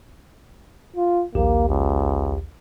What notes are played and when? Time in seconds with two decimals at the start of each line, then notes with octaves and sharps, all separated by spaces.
0.96 F4
1.35 A#1 D#2 A#3 G4
1.69 C#2